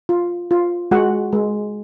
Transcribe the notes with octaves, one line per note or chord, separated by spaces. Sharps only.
F4
F4
G#3 F#4 F#5
G#3